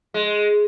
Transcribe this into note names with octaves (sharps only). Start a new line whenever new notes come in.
G#3